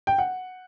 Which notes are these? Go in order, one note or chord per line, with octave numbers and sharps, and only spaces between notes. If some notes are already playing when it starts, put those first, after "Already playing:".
G5
F#5